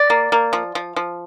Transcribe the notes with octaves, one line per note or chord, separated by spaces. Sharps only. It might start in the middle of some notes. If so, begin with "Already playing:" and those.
Already playing: D5
A#3
A#3
F3
F3
F3